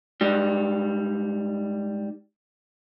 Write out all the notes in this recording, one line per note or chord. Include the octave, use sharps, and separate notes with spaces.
G#2 G3